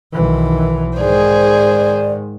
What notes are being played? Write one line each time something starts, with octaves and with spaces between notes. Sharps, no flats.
B1 D#3 E3
G#2 D#3 G#4 C5 D5